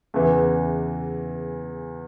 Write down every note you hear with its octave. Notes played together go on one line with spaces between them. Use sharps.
E2 C#3 E3